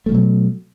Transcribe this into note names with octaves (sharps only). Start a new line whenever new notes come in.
B2 F3 F#3 A3